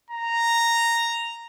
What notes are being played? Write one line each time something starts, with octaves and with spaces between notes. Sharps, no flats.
A#5